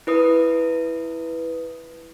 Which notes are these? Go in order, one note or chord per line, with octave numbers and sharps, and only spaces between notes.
E4 B4 D#6